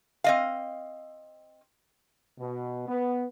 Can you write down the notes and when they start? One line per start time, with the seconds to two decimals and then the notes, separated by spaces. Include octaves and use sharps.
0.24 C4 D#5 F5
2.38 B2
2.88 B3